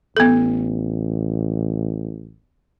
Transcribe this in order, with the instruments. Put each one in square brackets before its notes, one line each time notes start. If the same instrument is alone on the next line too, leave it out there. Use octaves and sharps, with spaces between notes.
[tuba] A1 [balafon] B3 A4